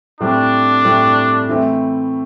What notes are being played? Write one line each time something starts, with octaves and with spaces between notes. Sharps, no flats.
A2 G3 C4 D4
A2 G3 C4
E3 A3 C4 E4